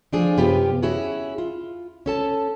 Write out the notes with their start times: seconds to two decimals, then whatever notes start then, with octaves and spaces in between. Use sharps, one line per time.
0.13 F3 A3 D4 F4 G#4
0.37 F#2 C3 B3 F4 G4 B4
0.83 C#4 E4 F#4 G#4
1.38 F4
2.06 C#4 A4 A5